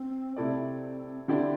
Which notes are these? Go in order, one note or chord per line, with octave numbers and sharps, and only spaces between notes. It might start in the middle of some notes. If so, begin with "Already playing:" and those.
Already playing: C4
C3 A3 C4 E4 A4 D5
D3 C4 D4 E4 G4 D5